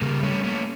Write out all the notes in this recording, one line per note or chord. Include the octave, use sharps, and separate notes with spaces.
C#3 G3 A#3
G3 A3 C#4
A3 A#3 C#4